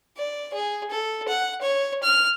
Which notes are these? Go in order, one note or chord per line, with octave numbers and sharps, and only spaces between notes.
D5
G#4
A4
F#5
C#5
F6